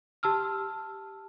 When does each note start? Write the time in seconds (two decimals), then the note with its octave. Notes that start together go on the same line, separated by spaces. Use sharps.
0.23 G4 A5 E6 F6